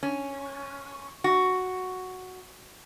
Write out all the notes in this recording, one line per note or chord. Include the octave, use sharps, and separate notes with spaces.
C#4
F#4